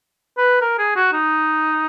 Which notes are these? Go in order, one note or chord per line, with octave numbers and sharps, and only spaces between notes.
B4
A#4
G#4
F#4
D#4